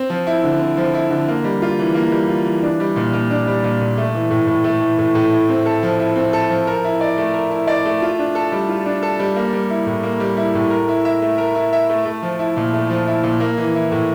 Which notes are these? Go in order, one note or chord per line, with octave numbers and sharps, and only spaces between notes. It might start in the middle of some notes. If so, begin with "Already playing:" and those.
Already playing: C4
F3
E4
D3
C4
F3
E4
D3
A#3
G3
F4
E3
A#3
G3
F4
E3
D4
G3
A#2
A#2
D4
G3
A#2
A#2
A3
E3
A2
A2
A3
E3
A2
A2
E4
C4
A4
F3
E4
C4
A4
F3
A#4
E4
D5
A3
A#4
E4
D5
A3
F4
D4
A4
G3
F4
D4
A4
G3
A#3
G3
E4
A2
A#3
G3
E4
A2
A#4
E4
E5
A3
A#4
E4
E5
A3
A3
F3
E4
A#2
A3
F3
E4
A#2
A#3
E3
E4
A2